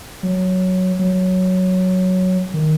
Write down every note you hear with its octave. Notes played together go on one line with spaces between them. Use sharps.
F#3
F#3
D#3